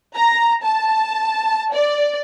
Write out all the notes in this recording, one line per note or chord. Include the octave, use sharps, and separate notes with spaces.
A#5
A5
D5